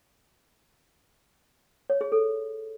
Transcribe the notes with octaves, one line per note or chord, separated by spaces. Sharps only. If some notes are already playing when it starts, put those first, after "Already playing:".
C#5
G#4
A4